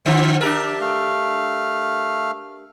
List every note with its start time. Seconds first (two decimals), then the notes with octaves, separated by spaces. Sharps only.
0.06 D3 F3 C4 C5 E5
0.41 D4 G4 A#4 E5 A5
0.81 A3 F5